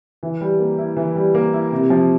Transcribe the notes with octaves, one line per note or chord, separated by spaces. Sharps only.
E3
G3
A#3
E4
E3
G3
A#3
E4
C3
F3